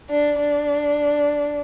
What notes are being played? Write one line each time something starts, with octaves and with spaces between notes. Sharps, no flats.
D4
D4